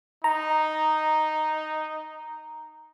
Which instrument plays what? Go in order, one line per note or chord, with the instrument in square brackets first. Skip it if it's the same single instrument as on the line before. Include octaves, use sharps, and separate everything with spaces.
[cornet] D#4 [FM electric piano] A#5